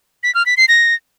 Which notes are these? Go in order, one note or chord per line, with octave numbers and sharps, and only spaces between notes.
B6
F6
B6
C7
A#6